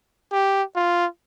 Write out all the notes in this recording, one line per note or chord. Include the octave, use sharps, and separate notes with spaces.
G4
F4